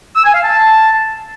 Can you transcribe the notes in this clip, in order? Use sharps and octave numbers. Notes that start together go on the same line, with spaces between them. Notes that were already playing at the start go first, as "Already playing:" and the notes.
E6
G#5
F5
A5